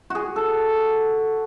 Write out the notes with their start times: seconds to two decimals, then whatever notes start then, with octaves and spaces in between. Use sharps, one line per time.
0.10 F#4 G#4
0.36 A4